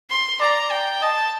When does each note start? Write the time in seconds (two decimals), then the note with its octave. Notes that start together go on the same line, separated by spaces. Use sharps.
0.10 C6
0.41 D5 A#5
0.71 G5
1.02 D#5 A5